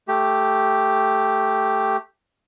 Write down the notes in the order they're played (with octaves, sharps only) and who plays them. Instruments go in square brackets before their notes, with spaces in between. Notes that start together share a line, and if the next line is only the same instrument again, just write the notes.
[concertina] A3 G4